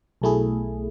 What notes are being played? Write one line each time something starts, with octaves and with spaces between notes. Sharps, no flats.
B1 B2 A3 E4 G#4